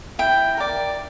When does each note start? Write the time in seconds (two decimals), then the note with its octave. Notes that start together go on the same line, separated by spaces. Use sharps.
0.19 E4 G5
0.57 A#4 D5